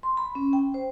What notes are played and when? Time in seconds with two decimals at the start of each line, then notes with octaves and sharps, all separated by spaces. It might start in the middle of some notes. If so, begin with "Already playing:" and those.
0.03 C6
0.17 B5
0.35 C#4
0.53 G5
0.74 C5